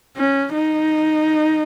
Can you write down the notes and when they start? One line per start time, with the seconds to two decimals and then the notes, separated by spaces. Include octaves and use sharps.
0.17 C#4
0.54 D#4